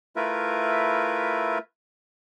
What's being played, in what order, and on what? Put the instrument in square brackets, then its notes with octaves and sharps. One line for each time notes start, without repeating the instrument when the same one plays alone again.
[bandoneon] A3 E4 F4 A#4 B4 E5